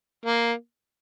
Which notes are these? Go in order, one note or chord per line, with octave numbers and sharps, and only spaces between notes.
A#3